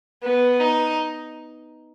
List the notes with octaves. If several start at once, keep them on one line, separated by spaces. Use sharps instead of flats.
B3
D#4